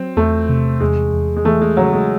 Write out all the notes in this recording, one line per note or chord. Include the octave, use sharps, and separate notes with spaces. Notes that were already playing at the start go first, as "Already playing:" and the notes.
Already playing: F#3 C4
E2 A3
C3
E2 G#3
E2
G#3
E3 A3
G#3
C#3 F#3
G#3